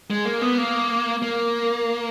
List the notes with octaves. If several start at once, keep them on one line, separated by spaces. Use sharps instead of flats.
G#3
A#3
B3
A#3
A#3